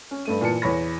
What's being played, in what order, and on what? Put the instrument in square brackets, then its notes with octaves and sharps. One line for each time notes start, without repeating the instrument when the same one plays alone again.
[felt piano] C#4
G2 A3 D#7
A#2 E3 A5 C#7
E2 C#5 B5 A#6